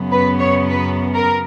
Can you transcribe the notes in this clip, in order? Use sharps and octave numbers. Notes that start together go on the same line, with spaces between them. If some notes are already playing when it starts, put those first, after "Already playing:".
Already playing: F#2 C#3 F#3 B3
B4
C#5
B4
A#4